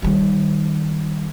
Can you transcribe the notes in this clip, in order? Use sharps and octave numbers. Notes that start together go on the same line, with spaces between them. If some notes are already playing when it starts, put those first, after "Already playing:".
D#3 G3